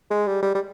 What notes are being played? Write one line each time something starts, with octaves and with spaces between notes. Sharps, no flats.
G#3
G3
G3
G3